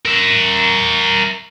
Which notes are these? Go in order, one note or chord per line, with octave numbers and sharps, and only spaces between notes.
A#4 E5